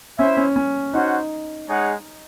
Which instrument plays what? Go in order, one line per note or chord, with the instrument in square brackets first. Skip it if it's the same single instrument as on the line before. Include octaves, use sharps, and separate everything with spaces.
[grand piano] C#4 [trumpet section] E4 C5 E5
[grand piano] C#4
C#4
[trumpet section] C#4 F#4 C5 F#5 [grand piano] D#4
[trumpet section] G#3 D#4 G#4 C#5 F#5